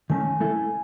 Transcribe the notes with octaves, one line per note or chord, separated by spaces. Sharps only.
D#3 A3 C#4 G#5
A3 E4 A4